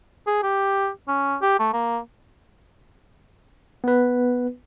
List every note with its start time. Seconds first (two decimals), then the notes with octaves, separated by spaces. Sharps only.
0.27 G#4
0.43 G4
1.08 C#4
1.42 G4
1.59 A3
1.73 A#3
3.84 B3 B4